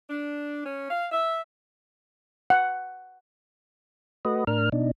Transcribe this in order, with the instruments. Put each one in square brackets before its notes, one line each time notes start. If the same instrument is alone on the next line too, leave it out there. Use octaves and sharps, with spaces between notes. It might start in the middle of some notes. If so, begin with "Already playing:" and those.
[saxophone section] D4
C#4
F5
E5
[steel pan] F#5
[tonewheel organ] A3 F#4 B4 D#5
A2 D4 A#4 F6
B2 D4 D#4